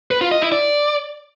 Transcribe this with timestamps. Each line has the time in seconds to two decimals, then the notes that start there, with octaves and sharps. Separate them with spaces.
0.11 B4
0.21 F4
0.31 D#5
0.42 E4
0.52 D5